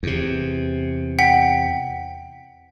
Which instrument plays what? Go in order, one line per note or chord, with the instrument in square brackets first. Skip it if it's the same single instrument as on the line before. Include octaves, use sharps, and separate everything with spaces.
[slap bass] E2 C3
[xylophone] F#5 G5 B6